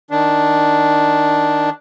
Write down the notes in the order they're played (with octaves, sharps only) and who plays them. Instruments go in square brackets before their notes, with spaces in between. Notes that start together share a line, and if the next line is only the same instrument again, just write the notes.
[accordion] D#3 D4